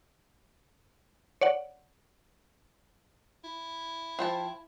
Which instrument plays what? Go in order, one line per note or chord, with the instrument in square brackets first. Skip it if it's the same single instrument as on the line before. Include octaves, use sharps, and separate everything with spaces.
[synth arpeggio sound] C#5 D5 F#5
[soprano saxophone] E4
[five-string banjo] F3 G5 A5